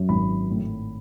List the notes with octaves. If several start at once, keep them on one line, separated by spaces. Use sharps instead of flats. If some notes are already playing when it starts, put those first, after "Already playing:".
Already playing: F#2
G#1 B5
A2